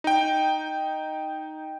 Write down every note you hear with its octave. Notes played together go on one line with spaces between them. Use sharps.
D#4 G5